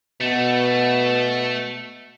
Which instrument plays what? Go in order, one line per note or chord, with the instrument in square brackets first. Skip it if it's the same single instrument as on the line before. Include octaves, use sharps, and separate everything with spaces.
[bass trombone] B2 [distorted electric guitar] A3